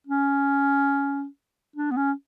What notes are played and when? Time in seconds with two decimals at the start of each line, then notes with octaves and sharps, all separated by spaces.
0.07 C#4
1.76 D4
1.91 B3
1.97 C#4